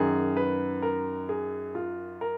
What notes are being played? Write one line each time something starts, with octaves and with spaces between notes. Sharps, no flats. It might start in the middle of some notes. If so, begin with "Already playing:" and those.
Already playing: F#2 D#3 F#3 G#4
B4
A#4
G#4
F4
A#4